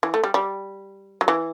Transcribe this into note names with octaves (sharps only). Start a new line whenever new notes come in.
E3
A3
G3
G3
F#3
E3